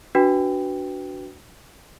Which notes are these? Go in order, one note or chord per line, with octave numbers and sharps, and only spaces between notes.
D4 F#4 B4 G5